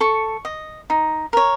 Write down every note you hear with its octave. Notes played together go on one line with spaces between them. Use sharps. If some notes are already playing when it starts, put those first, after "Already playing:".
A4 C#6
D#5
D#4
A#4 C#5